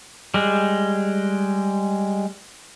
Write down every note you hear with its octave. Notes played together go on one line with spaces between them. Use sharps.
G3 G#3